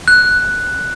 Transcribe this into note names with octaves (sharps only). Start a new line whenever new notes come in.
F#6